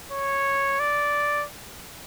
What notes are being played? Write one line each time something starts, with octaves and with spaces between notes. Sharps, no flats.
C#5
D5